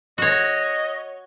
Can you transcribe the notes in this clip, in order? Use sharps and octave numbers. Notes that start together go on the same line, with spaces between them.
F#4 C#5 D#5